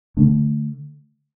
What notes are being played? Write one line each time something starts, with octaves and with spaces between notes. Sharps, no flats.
D3 A3 D4